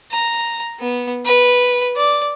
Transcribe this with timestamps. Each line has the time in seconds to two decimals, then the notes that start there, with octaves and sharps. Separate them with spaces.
0.11 A#5
0.80 B3
1.25 B4
1.96 D5